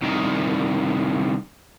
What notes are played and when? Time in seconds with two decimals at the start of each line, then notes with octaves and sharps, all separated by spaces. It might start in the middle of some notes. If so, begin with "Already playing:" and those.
0.02 C2 D#3